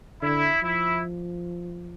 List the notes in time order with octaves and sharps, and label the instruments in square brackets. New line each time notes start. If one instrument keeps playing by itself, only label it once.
[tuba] D3 [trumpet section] E4
[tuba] F3 [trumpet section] E4